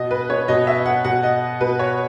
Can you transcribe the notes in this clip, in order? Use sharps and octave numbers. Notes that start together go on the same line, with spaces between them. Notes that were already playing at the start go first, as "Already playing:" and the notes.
Already playing: B2 D#5
B4
C#5
B2 D#5
E5
F#5
B2 F#5
D#5
B2 B4
C#5